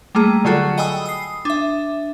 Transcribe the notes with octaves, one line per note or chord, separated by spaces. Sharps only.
G3 A3 A#3 G#4
D3 F#3 F4 F#4 A4
D#5 G5 G#5 B5 D#6 E6
D#6 C7
D4 E5